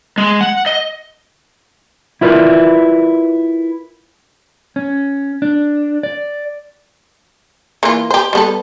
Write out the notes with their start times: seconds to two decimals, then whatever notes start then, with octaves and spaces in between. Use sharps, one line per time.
0.18 G#3
0.41 F#5
0.66 D#5
2.21 E4 F4 A#4 B4 D5 E5
4.76 C#4
5.42 D4
6.03 D5
7.83 E3 A#3 F4
8.10 G4 C5
8.33 G3 B3 A4